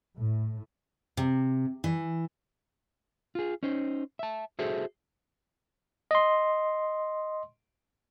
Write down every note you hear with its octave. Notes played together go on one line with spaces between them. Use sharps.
A2
C3
E3
F4 G#4
C#4 D#4 C5
E5 A5
F#4 G#4 A4 C5 E5
D#5 C6